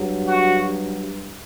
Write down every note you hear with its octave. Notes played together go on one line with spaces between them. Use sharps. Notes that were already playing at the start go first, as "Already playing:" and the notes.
Already playing: G2 F#3
F#4